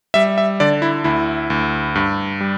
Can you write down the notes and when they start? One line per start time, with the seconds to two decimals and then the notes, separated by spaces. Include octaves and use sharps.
0.14 G3 E5
0.38 E5
0.60 D3 D5
0.82 E4
1.04 D2 E4
1.50 D2
1.95 G2
2.41 G3